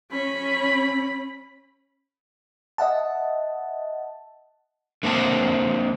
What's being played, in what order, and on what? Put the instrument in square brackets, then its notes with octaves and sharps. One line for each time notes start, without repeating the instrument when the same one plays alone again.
[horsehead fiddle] C#4 B5
[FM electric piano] D#5 E5 F#5 A5
[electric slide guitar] D3 A#3 C4 E5 F#5 A5